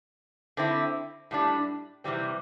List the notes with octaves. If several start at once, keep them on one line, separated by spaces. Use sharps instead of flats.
D3 C4 E4
A2 G3 D4
C3 E3 G3 C4